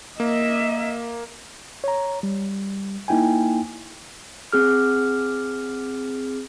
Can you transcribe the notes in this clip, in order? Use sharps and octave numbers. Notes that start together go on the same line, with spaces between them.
A#3 D#5 E5
C#5 A#5
G3
A#3 D#4 E4 G5 G#5
C4 G#4 F6